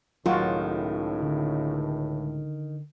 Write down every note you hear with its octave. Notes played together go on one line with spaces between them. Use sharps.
C#2 A2 D#3 F#3 F4 F#4
D3